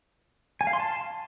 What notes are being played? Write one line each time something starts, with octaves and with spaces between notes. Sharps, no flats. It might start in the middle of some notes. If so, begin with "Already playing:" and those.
G#5
F5
C6
A5